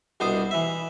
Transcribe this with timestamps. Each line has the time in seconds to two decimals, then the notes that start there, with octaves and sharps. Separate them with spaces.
0.20 C2 B2 D4 C5 D#6
0.51 E3 E5